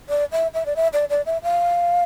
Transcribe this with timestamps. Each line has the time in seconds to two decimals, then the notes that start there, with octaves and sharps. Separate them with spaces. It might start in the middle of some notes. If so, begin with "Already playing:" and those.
0.09 D5
0.32 E5
0.54 E5
0.66 D5
0.76 E5
0.93 D5
1.10 D5
1.26 E5
1.43 F5